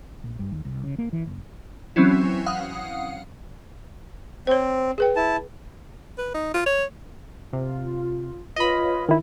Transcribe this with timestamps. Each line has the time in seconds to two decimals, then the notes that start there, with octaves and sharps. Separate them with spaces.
0.24 A#1
0.39 G2
0.52 D#2
0.65 C2
0.84 C#3
0.98 A#3
1.13 E3
1.27 F#1
1.96 E3 F#3 C4 C#4 E4
2.46 F5 F#5 D#6
4.47 C4 C5 C#5
4.98 G#4 B4 G5
5.16 E4 A5
6.18 B4
6.34 D#4
6.54 F4
6.66 C#5
7.53 C3 F4
8.56 F4 B4 C#5 D#5 B5
9.09 D#3 E4